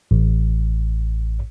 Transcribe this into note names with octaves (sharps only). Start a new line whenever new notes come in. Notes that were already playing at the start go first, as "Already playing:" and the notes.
A1